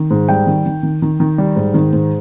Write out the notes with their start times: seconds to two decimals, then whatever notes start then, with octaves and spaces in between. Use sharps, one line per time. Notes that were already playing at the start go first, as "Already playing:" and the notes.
Already playing: D#3
0.11 G#2
0.29 G3 G5
0.47 D#3
0.66 D#3
0.83 D#3
1.02 D#3
1.20 D#3
1.38 G3
1.56 G#2
1.74 D#3
1.93 G#2